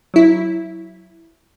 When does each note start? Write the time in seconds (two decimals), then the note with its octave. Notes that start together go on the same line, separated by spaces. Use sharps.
0.14 F#3 E4